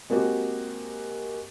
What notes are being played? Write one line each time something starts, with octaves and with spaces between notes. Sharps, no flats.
G#3 A#3 C4 F#4 G4